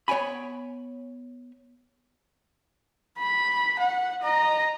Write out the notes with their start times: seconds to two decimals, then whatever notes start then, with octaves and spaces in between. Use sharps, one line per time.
0.08 B3 C#5 G5 G#5 B5
3.19 B5
3.79 F#5
4.22 D#5 A#5